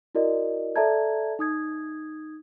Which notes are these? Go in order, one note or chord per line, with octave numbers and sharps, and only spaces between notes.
E4 F#4 A#4 D5 D#5
A4 D5 E5 A5 A#5 G#6
D#4 D#6 G#6